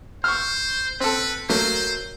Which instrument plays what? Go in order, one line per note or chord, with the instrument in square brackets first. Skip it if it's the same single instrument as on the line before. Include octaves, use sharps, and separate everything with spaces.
[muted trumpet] C5 [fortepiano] C#6 F6
[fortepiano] C4 A4 [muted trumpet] B4
[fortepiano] F#3 A3 A#3 [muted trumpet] C5